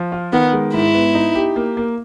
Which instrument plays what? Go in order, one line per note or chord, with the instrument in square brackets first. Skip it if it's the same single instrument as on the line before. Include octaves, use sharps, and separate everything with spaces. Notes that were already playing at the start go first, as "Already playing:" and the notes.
Already playing: [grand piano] F3
F4
[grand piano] D#3 [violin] B3
[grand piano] G#3
[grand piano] G#2 [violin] E4
[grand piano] B3
D#4
G4
A#3
A#3